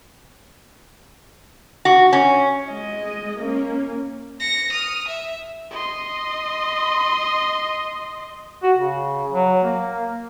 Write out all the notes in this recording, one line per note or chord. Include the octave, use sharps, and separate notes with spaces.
F#4
C#4
G#3 D#5
A#3 C#4
A#6 C#7
D#6 F6
E5
D#5 C6
F#4
C#3
F#3
A#3